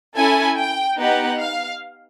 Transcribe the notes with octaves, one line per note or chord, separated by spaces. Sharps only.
C#4 E4 A4 G#5
G5
B3 D#4 G4 F#5
F5